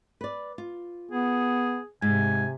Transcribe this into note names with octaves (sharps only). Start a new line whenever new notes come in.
B4 D5
F4
B3 G#4
G#2 C3 G#5